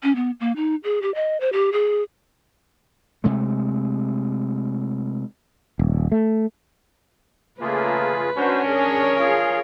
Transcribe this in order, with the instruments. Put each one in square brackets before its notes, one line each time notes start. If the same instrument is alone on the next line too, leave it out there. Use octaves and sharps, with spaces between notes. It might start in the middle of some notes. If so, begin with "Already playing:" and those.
[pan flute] C#4
B3
A#3
D#4
G#4
G4
D#5
C5
G4
G#4
[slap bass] C3 G#3 A3
[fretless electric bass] D#1
A3
[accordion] C#3 F4 G#4 [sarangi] A3 [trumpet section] A#3 [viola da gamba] B4
[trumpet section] C#4 [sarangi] D4 [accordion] F#4 C5
[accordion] G#4 [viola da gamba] A#4 C#5
[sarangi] F4 [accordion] G#4